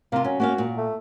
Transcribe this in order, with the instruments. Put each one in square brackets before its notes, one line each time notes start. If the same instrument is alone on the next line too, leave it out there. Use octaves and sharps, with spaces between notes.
[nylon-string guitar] C3 F4 [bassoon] A#3
[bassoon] F#3 [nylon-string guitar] C#4
[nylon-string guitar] A#3 C#4 F5 [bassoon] F#4
[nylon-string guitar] A#2
[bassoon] A3